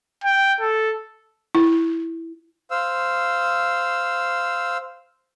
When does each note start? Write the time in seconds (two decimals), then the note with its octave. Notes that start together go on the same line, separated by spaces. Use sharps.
0.24 G5
0.61 A4
1.55 E4
2.71 C5 F5 E6